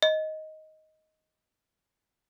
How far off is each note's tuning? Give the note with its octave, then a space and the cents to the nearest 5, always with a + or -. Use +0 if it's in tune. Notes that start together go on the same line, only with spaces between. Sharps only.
D#5 +10